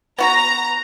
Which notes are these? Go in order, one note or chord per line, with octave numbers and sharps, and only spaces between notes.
B3 F#4 B4 A#5